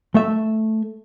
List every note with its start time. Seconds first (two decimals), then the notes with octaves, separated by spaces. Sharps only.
0.15 A3 E5